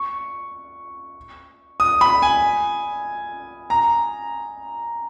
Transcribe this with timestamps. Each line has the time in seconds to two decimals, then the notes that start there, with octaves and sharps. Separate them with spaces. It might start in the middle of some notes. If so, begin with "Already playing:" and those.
Already playing: C#6
1.80 D#6
2.01 B5
2.22 G#5
3.70 A#5